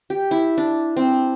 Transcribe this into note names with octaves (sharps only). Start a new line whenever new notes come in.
G4
E4
D4
C4